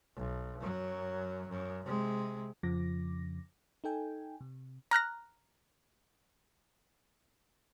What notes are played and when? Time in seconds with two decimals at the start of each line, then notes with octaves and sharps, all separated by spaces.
0.16 B1
0.60 F#2 F#3
1.49 F#2
1.86 C3 G#3
2.63 F2 C#3 F3 D6 A#6
3.84 D#4 A4 G5 G#5
4.41 C3
4.91 A#5 F6 F#6 A#6